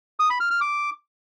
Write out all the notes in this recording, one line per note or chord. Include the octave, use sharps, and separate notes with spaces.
D#6
B5
F6
F6
D6